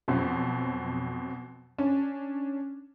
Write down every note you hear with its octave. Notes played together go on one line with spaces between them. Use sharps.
F2 B2 F3 F#3
C#4 D4